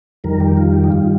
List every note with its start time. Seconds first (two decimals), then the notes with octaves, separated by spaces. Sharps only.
0.24 F2 D#3 G3 A#4
0.40 G4
0.57 F4
0.73 G4
0.84 D#4
0.89 G2 D#3 G3 F4